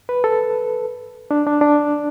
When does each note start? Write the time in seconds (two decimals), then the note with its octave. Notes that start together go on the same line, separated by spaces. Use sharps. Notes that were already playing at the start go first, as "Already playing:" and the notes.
0.09 B4
0.24 A4
1.31 D4
1.46 D4
1.61 D4